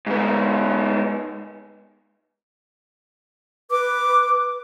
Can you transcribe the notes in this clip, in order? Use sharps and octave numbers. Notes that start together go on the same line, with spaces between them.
G#2 B3
B4 D6